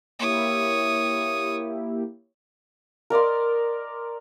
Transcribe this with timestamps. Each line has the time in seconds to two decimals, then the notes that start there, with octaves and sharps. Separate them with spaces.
0.19 A#3 E4 G4 C#5 D#6
3.10 A#4 D5 D#5 C6